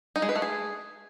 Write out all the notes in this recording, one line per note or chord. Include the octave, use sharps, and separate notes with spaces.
D#4
G#3
B4
A3
G#4